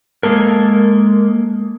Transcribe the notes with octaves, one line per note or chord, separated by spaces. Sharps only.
G#3 A#3 A4 A#4